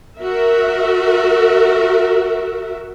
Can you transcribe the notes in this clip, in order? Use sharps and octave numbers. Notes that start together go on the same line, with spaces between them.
F#4 A#4 E5